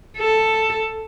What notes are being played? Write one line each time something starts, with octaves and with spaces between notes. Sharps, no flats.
A4